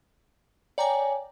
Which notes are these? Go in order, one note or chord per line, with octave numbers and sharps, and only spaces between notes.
C#5 D5 G5 G#5 A#5